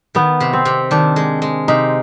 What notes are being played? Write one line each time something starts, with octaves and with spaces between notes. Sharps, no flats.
D#3 B3
C3
C4
C3
D#3 D4
G#3
G#3
C3 D#4